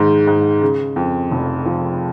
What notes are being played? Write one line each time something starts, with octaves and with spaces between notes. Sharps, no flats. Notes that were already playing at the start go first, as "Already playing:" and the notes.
Already playing: G#2 D#3
G#2
C#3
F2
F1
F3